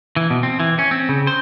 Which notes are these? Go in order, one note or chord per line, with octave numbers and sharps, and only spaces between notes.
E3
B2
C4
E3
C#4
C4
C#3
C5